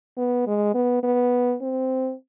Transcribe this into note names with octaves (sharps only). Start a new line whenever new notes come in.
B3
G#3
B3
B3
C4